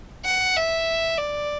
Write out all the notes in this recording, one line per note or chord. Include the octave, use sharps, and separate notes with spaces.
F#5
E5
D5